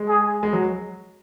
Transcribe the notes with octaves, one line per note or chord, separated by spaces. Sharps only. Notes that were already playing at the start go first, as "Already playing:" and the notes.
Already playing: G#3
G#4
G#3
F#3